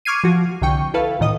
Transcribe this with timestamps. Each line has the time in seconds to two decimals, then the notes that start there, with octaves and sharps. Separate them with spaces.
0.05 C#6 D6 F6 G#6 C7 D#7
0.24 F3 F#4
0.62 C2 D3 G5 C#6
0.94 E4 A4 B4 F5
1.19 C#2 A2 D#3 D#5 D#6